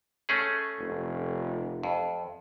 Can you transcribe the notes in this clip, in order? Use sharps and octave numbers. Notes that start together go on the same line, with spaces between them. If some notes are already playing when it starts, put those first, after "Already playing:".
A3 C#4 G#4
F1
F2